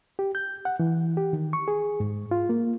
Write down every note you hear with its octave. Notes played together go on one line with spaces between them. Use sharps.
G4
G6
F#5
E3
G4
D#3
C#6
G#4
G#2
F4
A#3